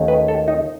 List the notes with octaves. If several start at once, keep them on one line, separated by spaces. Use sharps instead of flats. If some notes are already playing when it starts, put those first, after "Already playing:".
Already playing: D#2 D#3 A3 C#4
B4
A4
D#4